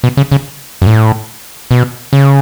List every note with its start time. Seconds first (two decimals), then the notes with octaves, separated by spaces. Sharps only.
0.04 B2
0.17 C#3
0.32 C#3
0.82 F#2
0.87 A2
1.71 B2
2.13 C#3